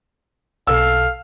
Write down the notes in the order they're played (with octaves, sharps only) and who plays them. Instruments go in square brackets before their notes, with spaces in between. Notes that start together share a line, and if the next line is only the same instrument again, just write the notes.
[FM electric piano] B1 B2 [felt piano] A4 E6 [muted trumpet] F5